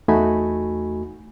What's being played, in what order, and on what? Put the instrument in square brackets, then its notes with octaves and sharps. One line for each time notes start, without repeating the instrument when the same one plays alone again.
[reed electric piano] E2 A3 D#4 F#4 G#5 B5